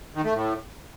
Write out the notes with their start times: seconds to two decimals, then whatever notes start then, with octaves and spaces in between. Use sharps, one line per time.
0.15 D#3
0.24 A3
0.34 A2